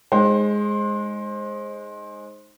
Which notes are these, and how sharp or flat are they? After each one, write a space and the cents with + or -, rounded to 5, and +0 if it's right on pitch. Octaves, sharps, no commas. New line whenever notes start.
G#3 +0 D#4 -5 C5 +20